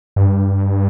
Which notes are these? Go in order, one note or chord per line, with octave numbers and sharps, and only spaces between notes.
G2